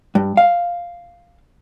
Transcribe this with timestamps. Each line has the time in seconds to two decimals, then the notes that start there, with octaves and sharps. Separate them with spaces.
0.15 G2
0.37 F5